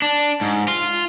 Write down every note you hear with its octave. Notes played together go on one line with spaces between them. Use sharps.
D4
G#2
F4